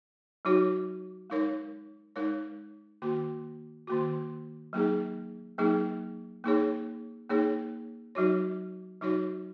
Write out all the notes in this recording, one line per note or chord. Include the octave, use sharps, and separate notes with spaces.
F#3 D#4 F#4 C#5
G#3 D#4 A#4 C#5
G#3 D#4 A#4 C#5
D#3 A#3 F#4
D#3 A#3 F#4
F#3 A#3 D#4 G#4
F#3 A#3 D#4 G#4
A#3 D#4 G#4 C#5
A#3 D#4 G#4 C#5
F#3 D#4 F#4 C#5
F#3 D#4 F#4 C#5